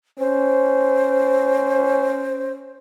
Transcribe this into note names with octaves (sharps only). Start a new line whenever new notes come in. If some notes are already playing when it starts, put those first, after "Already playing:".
C#4 C5